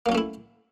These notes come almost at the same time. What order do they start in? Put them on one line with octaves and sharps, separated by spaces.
A#3 F#3 C#4 A3 E4